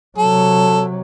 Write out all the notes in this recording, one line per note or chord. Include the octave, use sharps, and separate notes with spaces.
C3 F#3 A4